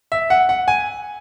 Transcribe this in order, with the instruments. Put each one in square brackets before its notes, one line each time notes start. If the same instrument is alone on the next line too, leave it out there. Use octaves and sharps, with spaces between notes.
[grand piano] E5
F#5
F#5
G#5